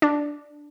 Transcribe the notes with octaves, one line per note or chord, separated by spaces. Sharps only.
D4